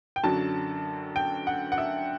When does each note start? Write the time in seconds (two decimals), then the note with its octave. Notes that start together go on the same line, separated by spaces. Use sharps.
0.16 G5
0.24 F#2 D3 F#3 A5
1.16 G5
1.47 F#5
1.72 F#5
1.78 E5